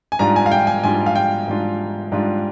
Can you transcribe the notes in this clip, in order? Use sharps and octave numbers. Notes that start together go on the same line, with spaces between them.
G#5
G#2 G3 D4 F4 A#5
G#5
F5
G5
G#5
G#2 G3 D4 F4 G#5
F5
G5
G#2 G3 D4 F4
G#2 G3 D4 F4